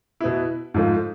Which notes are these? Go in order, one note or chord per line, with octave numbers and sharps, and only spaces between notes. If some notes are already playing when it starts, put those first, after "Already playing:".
B2 B3 E4
G#2 F3 A3